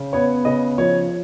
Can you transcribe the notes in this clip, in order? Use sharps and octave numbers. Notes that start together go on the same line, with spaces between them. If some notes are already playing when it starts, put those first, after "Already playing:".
Already playing: C#3
B3 C#5
C#3 D#5
F3 C#5